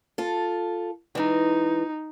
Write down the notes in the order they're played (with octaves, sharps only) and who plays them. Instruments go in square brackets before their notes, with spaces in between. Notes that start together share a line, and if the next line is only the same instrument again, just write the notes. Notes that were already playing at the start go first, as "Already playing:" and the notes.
[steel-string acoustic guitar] F4 A4
[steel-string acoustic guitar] E3 G#3 [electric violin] D#4